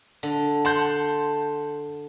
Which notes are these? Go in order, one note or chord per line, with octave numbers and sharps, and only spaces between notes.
D3
F#5 A5 C6 G6